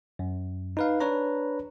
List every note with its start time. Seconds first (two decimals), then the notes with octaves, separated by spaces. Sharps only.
0.19 F#2
0.77 D#4 B4 F5
1.00 D4 B4 C#5 A#5